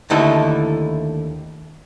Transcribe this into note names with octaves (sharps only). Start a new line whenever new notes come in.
D#2 D3 A3 D#4 E4 A4